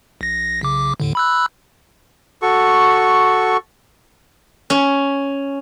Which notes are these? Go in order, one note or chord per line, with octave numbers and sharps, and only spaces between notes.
A#1 A#6
B1 C#3 D6
D#2 A2 D3
B5 E6 F#6
F#4 A4 C#6
C#4